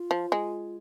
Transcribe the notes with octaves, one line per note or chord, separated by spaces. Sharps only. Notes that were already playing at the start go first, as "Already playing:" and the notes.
Already playing: F4
F3
G#3